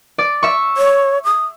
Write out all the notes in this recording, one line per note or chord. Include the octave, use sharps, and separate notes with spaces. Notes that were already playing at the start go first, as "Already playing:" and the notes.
D5
E5 C#6
C#5
D#6